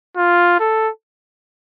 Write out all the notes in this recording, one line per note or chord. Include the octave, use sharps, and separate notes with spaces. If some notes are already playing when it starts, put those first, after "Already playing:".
F4
A4